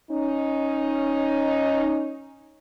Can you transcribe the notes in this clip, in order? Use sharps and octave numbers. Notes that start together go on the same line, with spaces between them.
C#4 D#4